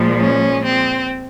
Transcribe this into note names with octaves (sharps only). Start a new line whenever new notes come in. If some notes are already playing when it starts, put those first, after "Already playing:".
Already playing: A#2 F3 G#3
C#4
C4